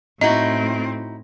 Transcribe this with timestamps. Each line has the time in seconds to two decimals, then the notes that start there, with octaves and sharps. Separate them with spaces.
0.21 A2 C4 D#4 E4 F#4 D#5